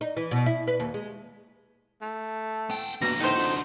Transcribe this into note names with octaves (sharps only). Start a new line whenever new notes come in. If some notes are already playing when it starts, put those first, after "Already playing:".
D#4
E3
B2
E4
B4
D#2
G#3
A3
B3 G5
B2 D3 A#3 A#5
A2 D#4 C5
F2 D4 F#4